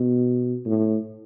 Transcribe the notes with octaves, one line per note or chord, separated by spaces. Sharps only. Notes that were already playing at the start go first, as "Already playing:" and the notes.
Already playing: B2
A2